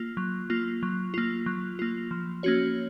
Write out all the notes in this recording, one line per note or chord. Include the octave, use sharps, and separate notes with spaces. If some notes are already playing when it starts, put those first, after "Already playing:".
Already playing: A#3 F4
F#3
A#3 F4
F#3
A#3 F4
F#3
A#3 F4
F3
A#3 C#4 F#4 C#5